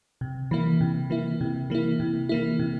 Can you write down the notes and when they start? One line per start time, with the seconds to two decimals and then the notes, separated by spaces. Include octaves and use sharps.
0.21 C3
0.51 E3 A#3 E4
0.81 C3
1.10 E3 A#3 E4
1.41 C3
1.70 E3 A#3 E4
2.00 C3
2.29 E3 A#3 E4
2.59 C3